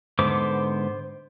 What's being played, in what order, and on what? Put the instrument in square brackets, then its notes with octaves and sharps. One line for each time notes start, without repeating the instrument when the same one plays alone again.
[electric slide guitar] G#2 D3 B3 [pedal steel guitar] C5 D6